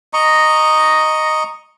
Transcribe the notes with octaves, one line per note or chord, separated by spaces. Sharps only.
D#5 A#5 C#6